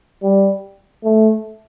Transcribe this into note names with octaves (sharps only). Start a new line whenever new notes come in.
G3
A3